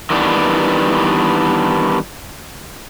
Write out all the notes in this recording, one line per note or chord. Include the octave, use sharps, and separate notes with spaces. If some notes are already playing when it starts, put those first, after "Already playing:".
D#3 E3 G3 B3 D4